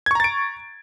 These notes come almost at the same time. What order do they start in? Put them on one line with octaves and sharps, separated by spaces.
G#6 C#6 A#5 A6 D7